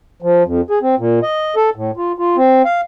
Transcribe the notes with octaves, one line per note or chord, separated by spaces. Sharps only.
F3
F2
G#4
C4
A#2
D#5
A4
A2
F4
F4
C4
F5